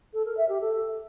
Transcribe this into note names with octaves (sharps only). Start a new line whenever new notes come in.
A4
A#4
E5
G4
A4